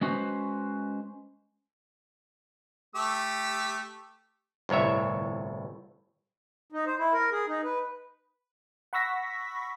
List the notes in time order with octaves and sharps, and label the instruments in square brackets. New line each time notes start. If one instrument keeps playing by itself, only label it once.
[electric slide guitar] G#3 C#4 F#4 B4 C5
[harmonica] A3 G4 E6
[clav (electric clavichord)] G1 C2 A2 C#5 E5
[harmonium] D#4
C5
E4
A#4
G#4
D#4
B4
[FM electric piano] F#5 B5 C#6 E6 A#6 B6